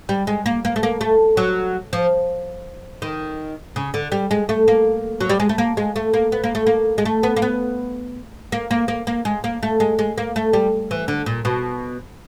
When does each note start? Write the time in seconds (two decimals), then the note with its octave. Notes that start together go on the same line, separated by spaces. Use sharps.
0.09 G3
0.27 G#3
0.46 A#3
0.65 A#3
0.76 A3
0.83 A#3
1.01 A3
1.37 F#3
1.93 F3
3.02 D#3
3.76 C#3
3.94 D3
4.12 G3
4.31 G#3
4.49 A3
4.68 A#3
5.21 F#3
5.30 G3
5.40 G#3
5.49 A3
5.58 A#3
5.77 G#3
5.96 A3
6.14 A#3
6.32 B3
6.44 A#3
6.55 A3
6.66 A#3
6.98 G#3
7.05 A3
7.23 B3
7.36 A#3
7.42 B3
8.52 A#3
8.71 A#3
8.88 A#3
9.07 A#3
9.25 G#3
9.44 A#3
9.63 A3
9.80 G#3
9.99 G#3
10.18 A#3
10.36 A3
10.53 G3
10.91 E3
11.08 D3
11.26 A#2
11.45 B2